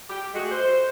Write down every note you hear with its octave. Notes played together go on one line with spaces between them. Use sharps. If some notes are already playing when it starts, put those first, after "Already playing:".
G4
G#3 A3 F#4 G#4
C5